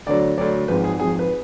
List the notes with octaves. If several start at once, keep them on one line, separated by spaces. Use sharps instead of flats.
D2 D3 F#3 D5
D2 D3 F#3 D5
G#1 G#2 F3 B4
G#4
G#1 G#2 F3 G#4
B4